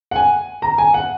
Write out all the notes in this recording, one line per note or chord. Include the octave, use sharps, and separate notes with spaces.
F#5
G#5
A#5
G#5
F#5